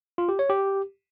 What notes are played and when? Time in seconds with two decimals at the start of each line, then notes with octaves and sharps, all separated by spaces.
0.18 F4
0.29 G4
0.39 C#5
0.49 G4